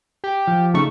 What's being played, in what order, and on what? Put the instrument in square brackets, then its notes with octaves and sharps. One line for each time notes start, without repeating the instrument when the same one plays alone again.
[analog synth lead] G4
[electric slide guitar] F3
[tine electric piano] C#3 D#4 C#6 [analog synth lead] A3